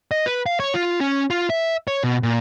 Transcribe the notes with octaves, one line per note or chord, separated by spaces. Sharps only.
D#5
B4
F5
C#5
F4
C#4
F4
E5
C#5
B2
A#2